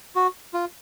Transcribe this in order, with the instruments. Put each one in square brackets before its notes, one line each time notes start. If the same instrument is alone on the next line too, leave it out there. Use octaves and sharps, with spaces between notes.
[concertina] F#4
F4